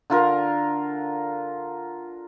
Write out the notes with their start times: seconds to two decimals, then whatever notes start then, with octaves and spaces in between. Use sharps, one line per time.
0.10 D3 F4 A#4